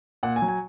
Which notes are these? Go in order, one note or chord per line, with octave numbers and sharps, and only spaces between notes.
A#2 F#5
G#5
F#3
G#5